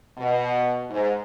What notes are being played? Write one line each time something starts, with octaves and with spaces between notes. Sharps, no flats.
B2
G#2